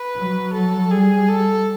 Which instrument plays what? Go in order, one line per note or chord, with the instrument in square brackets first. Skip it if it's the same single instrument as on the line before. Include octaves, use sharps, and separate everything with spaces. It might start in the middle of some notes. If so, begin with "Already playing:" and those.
Already playing: [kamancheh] B4
[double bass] F#3
[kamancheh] A4
[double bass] G3 [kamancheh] G#4
[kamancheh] A4